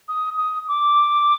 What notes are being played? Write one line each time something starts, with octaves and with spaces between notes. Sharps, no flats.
D#6
D#6
D6